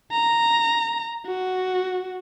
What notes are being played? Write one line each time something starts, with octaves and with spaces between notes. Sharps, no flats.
A#5
F#4